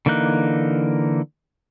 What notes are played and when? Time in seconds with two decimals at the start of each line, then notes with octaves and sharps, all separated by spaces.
0.06 D3 E3 A#3 D#4 F#6